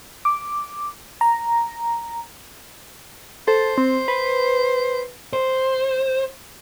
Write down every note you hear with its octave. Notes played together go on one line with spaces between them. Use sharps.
D6
A#5
A4 C5
C4
B4
C5